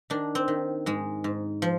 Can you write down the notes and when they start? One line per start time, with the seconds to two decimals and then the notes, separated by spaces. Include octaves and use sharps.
0.10 D#3 D4
0.35 C4
0.48 D#3
0.86 G#2 G#3
1.24 G#2
1.62 F3